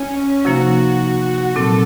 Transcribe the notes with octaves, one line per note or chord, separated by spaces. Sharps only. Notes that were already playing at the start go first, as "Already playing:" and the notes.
Already playing: C#4
C3 F3 A#3 D#4 F#4
A#2 F#3 C4 A4